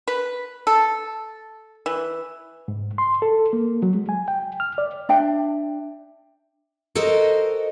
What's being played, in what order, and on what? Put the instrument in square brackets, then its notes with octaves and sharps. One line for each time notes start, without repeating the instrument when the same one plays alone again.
[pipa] B4
A4
E3
[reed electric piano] G#2
C6
A4
A#3
F#3
G#3
G#5
G5
F6
D5
[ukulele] D4 E5 G5
[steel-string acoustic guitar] F#4 A4 A#4 C5 D#5